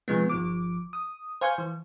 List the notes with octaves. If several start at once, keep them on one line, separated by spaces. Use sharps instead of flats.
C3 F3 G#3 B3
G1 F3 D6
D#6
C5 F5 G#5 C#6 G6
E3